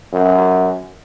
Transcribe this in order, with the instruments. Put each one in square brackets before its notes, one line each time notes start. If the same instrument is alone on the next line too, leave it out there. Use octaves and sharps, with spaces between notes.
[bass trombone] F#2